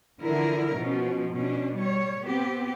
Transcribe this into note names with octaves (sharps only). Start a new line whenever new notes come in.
D3 E3 F3 E4 A#4
B2 F3 C#4
B2 C#4 D4
G3 C#5
B3 C4 G4